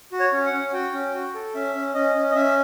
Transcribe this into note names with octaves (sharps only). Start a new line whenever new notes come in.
F#4
C#5
C#4
F#5
C#4
F#4 G5
C#4
F#4
A4
C#4 E5
C#4
C#4 D#5
C#4
D#5
C#4 E5